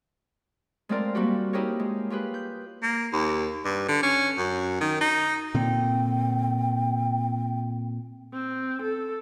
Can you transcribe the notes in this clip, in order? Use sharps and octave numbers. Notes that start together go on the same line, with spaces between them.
G#3 A3 C4 F4 A#4 D5
G3 A#3 C4 F#4 G4
D#4 E4 G4 G#4 A#4 C#5
G#3
F4 G4 G#4 B4
G6
A#3
D#2
G2
D3
C#4
F#2
D#3
D#4
A#2 D3 C4 G5
C4
A4